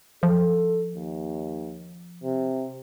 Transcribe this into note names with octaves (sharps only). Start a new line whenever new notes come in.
F3 A4
D#2
C3